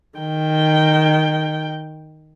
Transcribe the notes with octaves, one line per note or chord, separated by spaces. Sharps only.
D#3 G5